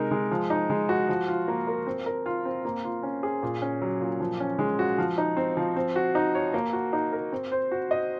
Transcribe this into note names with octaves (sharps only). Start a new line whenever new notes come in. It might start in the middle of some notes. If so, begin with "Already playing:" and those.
Already playing: C3 G#3 D#4 A#4
G#3
F3
D#4
G#3
F#4
F3
F4
A#3
A#4
C4
A#4
F4
C4
A#3
F4
C#4
G#4
A#2
C#4
F#3
A#2
F3
C#4
G#3
F#4
F3
D#4
C4
F3
C4
F#4
D#4
C#5
A#3
F#4
D#4
A#4
C4
C5
F#4
D#5